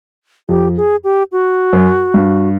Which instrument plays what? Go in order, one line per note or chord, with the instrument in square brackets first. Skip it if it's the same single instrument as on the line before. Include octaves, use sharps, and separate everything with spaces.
[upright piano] F2 [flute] G4
[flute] G#4
G4
F#4
[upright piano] F#2
G2